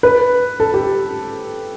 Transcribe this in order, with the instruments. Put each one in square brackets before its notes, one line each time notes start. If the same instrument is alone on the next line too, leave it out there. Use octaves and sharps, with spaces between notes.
[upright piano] B4
A4
G4